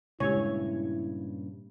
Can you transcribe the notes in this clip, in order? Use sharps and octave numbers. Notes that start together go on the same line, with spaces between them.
G2 A#2 C#3 G#3 E4 G4 C#5 E6